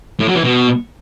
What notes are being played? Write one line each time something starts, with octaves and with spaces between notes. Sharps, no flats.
A2
F#3
E3
B2